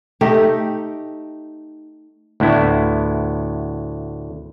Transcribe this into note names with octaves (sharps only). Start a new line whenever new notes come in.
A3 D#4 G4
D2 A2 B3 E4